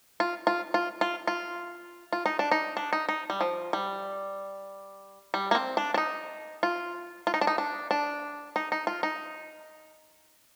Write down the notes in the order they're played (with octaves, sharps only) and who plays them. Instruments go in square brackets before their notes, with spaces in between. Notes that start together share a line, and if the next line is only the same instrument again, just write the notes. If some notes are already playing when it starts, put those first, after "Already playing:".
[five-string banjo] F4
F4
F4
F4
F4
F4
D#4
D4
D#4
D4
D#4
D#4
G3
F3
G3
G3
A#3
C4
D4
D4
D#4
F4
F4
D#4
D4
D#4
D4
D4
D#4
D#4
F4
D#4